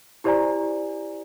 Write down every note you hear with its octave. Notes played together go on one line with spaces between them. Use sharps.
E4 G4 C5 D5 G#5 A#5